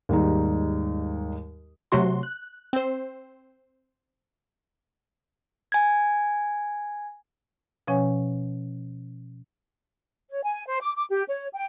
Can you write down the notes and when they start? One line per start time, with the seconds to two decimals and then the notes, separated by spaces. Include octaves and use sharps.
0.09 D#2 G#2 G3 D#4
1.92 C3 F#3 A3 F#4 C6
2.23 F#6
2.73 C4 C5
5.72 G#5 G#6
7.87 B2 F3 C#4 C#5 F#5 G#5
10.29 C#5
10.43 G#5
10.66 C5
10.81 D6
10.97 D6
11.09 G4
11.28 C#5
11.53 G5